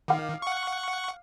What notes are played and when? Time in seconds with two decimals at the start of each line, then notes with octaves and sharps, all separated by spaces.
0.08 D#3 F5 D6
0.42 F#5 C#6